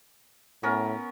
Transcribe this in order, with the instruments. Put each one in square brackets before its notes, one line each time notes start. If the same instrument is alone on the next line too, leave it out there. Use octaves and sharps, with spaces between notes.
[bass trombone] A2 [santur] B3 C#4 A#4